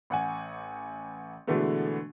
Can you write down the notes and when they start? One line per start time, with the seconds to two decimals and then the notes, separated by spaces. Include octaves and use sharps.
0.10 A1 F#5 G#5
1.47 B2 D3 E3 G#3 A3 B3